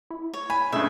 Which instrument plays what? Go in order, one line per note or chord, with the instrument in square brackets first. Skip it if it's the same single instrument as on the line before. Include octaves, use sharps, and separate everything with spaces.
[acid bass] E4
[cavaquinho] C#5
[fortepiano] G#5 [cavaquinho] B5
[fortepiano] G2 C#3 [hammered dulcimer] A3 D#4 [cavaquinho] E5